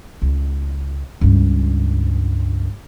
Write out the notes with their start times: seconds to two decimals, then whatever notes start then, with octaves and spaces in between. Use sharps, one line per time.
0.22 C#2
1.21 C#2 G2